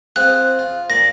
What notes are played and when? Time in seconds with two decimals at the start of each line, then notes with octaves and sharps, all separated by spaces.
0.16 C4 F4 G#4 F#6
0.59 F4
0.90 A#2 D5 A#6